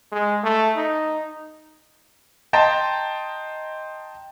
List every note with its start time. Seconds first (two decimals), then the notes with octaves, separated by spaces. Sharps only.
0.12 G#3
0.43 A3
0.76 D#4
2.53 D#5 G5 A5 A#5 C6 A6